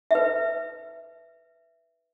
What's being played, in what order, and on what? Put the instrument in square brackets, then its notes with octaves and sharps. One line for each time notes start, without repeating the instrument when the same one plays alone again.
[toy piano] B4 E5